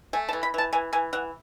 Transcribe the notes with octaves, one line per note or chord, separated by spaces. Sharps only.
A3 G#5
A5
E3
B5
E3 A5
E3 G#5
E3 G#5
E3 F#5